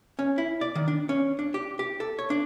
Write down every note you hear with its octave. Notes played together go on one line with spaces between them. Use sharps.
C#4
E4
D5
D#3
D4
C#4
D4
G4
G4
A4
C#5
D4